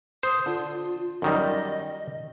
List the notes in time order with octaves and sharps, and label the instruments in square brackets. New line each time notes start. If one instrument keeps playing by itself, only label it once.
[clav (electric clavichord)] C5 [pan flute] D#6
[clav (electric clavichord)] D3 [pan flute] F4
[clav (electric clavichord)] F#2 D#3 G3 [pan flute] D#5